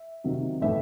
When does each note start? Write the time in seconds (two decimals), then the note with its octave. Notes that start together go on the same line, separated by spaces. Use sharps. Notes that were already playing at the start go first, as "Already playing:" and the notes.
Already playing: E5
0.24 C3 D#3 F#3
0.62 A2 E3 A3 E5